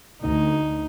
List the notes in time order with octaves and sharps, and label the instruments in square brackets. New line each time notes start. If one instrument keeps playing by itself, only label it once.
[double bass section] D2 [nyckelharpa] D#4